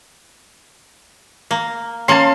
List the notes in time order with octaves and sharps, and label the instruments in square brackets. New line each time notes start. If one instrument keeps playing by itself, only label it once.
[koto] A#3
[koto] A#3 C#4 [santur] A5 C6